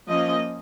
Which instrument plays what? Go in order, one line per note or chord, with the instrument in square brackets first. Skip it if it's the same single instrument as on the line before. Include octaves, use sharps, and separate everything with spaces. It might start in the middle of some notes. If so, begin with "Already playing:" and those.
[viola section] F3 A#3 C#4 D#5